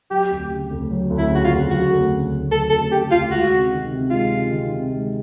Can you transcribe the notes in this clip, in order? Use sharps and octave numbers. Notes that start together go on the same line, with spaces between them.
F#3 G4
D2
C#3
D2
F#3
D2
E4
C#3 F#4
F4
D2
F#3 F#4
D2
C#3
D2
F#3 A4
D2 A4
C#3 G4
D2 F4
G#3 F#4
C3
D#3
C3
G#3 F4
C3
D#3
C3
G#3